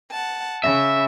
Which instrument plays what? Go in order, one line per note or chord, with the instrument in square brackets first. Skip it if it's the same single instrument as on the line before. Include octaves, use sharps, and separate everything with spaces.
[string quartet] F#5 A5
[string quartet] C#3 [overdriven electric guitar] E5